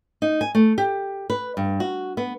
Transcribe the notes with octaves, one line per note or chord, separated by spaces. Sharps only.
D#4
G#5
A3
G4
B4
G2
F#4
B3